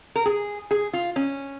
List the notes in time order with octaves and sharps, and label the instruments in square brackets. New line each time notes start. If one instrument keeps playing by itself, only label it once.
[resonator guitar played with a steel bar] A#4
G#4
G#4
F4
C#4